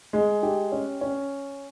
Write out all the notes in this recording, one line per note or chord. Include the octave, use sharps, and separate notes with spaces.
G#3
G4
C#4
C#4